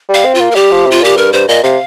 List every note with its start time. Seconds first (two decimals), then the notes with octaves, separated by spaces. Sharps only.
0.09 G3
0.14 F5
0.25 C4
0.35 F4
0.40 A#3
0.51 A#4
0.55 G3 G4
0.71 F3
0.86 C3
0.91 F4
1.02 A#2 G4
1.17 G2 A#4
1.33 G2 C5
1.48 A#2 D#5
1.63 C3 F5